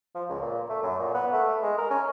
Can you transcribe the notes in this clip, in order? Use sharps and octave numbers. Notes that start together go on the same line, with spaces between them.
F3
C#2
A#2
A3
F#2
A#2
B3
A3
G#3
A#4
C#4